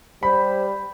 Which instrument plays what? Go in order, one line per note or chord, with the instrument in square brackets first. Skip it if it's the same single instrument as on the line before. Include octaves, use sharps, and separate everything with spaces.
[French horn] G3 [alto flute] C5 [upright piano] B5